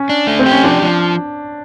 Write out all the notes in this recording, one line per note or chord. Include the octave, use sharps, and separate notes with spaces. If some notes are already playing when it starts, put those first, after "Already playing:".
Already playing: C#4
D4
A3
C4
G4
C#4
F3 D4
F3